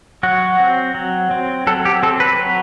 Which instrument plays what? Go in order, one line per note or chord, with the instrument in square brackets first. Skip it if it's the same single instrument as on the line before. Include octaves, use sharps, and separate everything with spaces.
[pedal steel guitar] F#3 F#4
C4
F#3
C4
F#3 A4
G4
C4 A4
B4
F#3